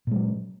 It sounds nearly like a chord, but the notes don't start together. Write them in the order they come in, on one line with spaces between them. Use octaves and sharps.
A#2 G#3 F#3